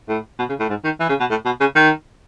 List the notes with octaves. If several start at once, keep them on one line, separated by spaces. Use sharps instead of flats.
A2
B2
C#3
A2
G#2
D#3
E3
C#3
B2
A2
B2
C#3
D#3